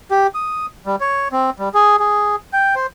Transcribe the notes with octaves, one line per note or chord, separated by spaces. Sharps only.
G4
D#6
G3
C#5
C4
G3
G#4
G#4
G5
C5